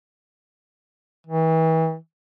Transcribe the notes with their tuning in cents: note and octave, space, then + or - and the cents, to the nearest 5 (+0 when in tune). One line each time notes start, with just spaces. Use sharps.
E3 -35